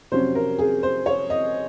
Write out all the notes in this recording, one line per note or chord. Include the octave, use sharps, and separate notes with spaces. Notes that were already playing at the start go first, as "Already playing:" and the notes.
F2 C3 F#3 C#4 C5
A#4
G#4
C5
C#5
D#5